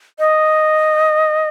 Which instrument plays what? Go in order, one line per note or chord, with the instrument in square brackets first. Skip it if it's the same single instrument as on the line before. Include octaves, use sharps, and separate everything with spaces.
[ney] D#5